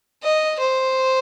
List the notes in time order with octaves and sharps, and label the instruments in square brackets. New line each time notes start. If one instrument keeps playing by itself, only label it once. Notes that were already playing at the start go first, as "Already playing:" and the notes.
[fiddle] D#5
C5